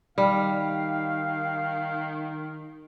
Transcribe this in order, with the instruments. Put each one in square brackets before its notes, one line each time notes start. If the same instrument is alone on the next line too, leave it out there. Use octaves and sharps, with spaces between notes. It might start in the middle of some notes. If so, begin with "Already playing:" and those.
[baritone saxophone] D#3 [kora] G3 [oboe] F5